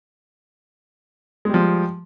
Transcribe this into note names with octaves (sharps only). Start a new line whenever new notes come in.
F3 G3 G#3